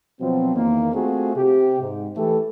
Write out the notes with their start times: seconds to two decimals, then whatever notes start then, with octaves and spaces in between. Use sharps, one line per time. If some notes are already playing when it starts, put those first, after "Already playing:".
0.20 B2 F3 F#3 C4
0.55 E2 D#3 A#3
0.93 A3 C4 F4 F#4 G#4
1.35 C3 G4
1.80 G#2
2.16 E3 A3 G4 A4